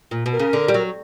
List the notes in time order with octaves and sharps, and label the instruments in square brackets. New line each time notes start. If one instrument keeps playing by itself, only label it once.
[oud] A#2
B2
[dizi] A#4
[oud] C#3
D3
G3
F#3